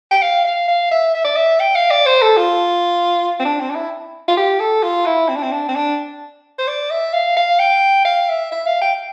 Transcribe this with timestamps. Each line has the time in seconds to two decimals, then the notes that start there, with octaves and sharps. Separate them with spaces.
0.11 G5
0.22 F5
0.45 F5
0.68 F5
0.91 E5
1.15 E5
1.25 D5
1.36 E5
1.60 G5
1.75 F5
1.91 D5
2.06 C5
2.22 A4
2.37 F4
3.40 C4
3.45 D4
3.60 C4
3.70 D4
3.75 E4
4.28 F4
4.37 G4
4.60 A4
4.83 F4
5.06 E4
5.29 C4
5.36 D4
5.43 C4
5.52 D4
5.69 C4
5.75 D4
6.59 C5
6.67 D5
6.91 E5
7.13 F5
7.37 F5
7.59 G5
8.05 F5
8.29 E5
8.52 E5
8.67 F5
8.82 G5